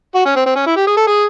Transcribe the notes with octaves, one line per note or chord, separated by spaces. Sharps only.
F#4
C#4
C4
C4
C#4
E4
G4
G#4
A4
G#4